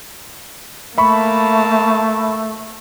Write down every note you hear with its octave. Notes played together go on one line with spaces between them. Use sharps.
A3 A#3 E5 A5 B5 C#6